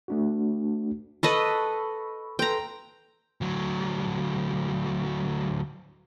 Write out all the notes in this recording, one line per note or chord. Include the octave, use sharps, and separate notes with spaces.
A3 D4 F#4
A4 B4 D#5 B5 C#6 E6
A4 B4 G5 A#5 C6
D2 F#3